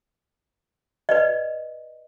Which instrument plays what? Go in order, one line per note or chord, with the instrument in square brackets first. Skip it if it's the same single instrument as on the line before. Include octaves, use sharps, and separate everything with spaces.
[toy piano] B4 D5 D#5